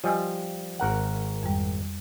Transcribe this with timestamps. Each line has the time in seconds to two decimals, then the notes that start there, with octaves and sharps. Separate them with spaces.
0.04 F3 G3 D#5 G#5 E6
0.80 G#1 A#4 F#5
1.43 F2 G3